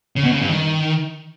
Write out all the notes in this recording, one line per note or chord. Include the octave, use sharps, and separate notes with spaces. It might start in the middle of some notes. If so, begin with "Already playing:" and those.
C#3
B2
C#3
G2
D#3